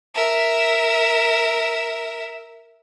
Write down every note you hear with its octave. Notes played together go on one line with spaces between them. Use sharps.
A#4 E5